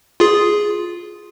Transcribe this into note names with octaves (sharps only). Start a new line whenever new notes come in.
F4 G#4